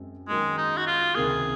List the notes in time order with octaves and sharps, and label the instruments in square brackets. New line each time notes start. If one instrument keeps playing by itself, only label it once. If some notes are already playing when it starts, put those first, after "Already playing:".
Already playing: [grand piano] F#2 G#3 C4
[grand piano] D#3 F#3 A#3 C#4 G#4 [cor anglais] G#3
[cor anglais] D#4
F#4
F4
[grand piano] C#2 C3 D#3 A#3 [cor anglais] G#4